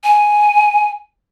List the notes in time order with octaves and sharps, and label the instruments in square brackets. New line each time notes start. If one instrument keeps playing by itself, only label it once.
[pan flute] G#5